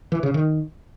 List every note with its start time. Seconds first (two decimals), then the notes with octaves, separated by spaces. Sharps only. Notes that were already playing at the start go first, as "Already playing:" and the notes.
0.12 E3
0.23 C#3
0.34 D#3